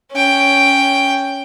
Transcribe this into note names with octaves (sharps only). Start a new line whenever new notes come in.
C#4 G5